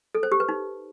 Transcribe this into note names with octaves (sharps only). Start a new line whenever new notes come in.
A4
C5
G4
B4
D#4